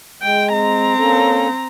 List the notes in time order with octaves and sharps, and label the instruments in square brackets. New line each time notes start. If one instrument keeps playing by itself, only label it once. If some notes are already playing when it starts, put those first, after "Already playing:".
[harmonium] G#3 [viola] G5
[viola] C4 A#5
[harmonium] A#3 C#4 A4